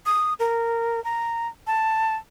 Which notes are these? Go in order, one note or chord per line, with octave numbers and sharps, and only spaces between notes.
D#6
A#4
A#5
A5